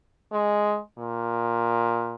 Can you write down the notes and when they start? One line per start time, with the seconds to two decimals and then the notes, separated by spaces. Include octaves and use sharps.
0.32 G#3
0.98 A#2